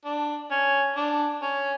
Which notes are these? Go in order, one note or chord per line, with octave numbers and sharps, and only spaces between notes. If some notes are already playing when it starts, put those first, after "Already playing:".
D4
C#4
D4
C#4